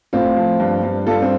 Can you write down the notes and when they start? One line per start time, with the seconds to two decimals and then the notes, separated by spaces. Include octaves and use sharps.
0.13 A2 C4 F4
0.37 F3
0.60 G2
0.83 G2
1.07 G2 F4 A4
1.22 C4